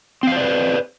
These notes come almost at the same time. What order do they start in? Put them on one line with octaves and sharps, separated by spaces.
C4 F5 C5 D5 B4